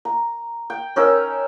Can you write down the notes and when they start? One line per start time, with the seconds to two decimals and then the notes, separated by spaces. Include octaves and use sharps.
0.05 A#5
0.70 G5
0.96 C#4 D#4 A#4 E6